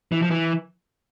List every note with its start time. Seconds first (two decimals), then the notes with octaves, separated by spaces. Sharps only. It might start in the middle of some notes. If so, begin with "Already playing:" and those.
0.12 E3
0.22 F3
0.31 E3